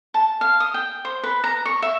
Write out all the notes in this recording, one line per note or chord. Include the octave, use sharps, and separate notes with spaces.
A5
F5
D#6
G5
C5
B4
A#5
C#6
E5